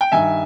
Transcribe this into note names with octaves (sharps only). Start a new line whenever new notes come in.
G5
G2 D#3 E5 G#5